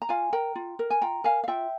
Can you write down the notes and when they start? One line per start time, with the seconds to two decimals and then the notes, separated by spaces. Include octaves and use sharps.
0.02 A#5
0.09 F4 F5 G#5
0.33 A#4 G5 A#5
0.56 F4
0.79 A#4
0.90 G#5
1.02 F4 G5 A#5
1.24 A#4 F5 G#5
1.44 F5
1.48 F4 E5 G5